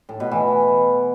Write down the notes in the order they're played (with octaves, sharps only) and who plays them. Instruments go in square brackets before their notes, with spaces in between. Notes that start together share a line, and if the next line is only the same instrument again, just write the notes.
[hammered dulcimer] A2
B2
E3